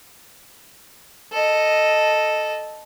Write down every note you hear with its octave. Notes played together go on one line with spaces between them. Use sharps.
A4 D#5